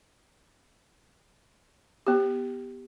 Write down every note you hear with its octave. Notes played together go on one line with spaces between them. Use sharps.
B3 G4